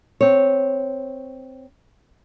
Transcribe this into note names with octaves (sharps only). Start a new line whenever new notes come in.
C4 C#5